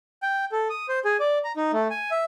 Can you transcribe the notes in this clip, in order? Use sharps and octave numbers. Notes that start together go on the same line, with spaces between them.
G5
A4
D#6
C5
G#4
D5
A#5
D#4
A3
G#5
E5